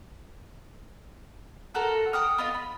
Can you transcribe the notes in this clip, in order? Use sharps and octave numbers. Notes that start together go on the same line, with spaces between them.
F4 F#4 A4 A#4
F#5 G5 D#6 F6
B3 F4 D#5
B5